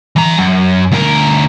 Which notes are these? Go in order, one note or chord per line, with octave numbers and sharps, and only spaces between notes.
E3 A#5
F#2
D2 A#4